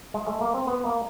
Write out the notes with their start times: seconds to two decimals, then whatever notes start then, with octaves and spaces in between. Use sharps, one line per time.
0.14 G#3
0.27 A3
0.41 A#3
0.54 C4
0.67 B3
0.85 A#3